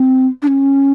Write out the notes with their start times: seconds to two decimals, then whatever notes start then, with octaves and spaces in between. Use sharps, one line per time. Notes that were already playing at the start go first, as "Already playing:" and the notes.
Already playing: C4
0.42 D4
0.47 C#4